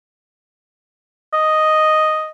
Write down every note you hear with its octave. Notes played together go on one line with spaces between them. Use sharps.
D#5